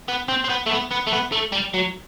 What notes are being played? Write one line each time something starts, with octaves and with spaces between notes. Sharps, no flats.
B3
C4
C4
B3
A3
B3
B3
A3
B3
A3
G3
F#3